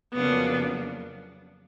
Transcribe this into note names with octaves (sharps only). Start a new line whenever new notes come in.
F2 C#3 F#3 A#3 B3 D4